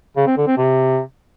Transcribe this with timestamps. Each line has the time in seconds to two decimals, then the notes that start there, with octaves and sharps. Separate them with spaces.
0.17 C#3
0.27 C4
0.37 D3
0.47 C4
0.58 C3